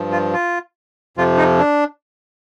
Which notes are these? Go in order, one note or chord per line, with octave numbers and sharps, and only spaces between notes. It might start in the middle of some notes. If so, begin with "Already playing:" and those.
Already playing: G2 F3
F4
F4
F2 C3 F3 F4
D#4
D4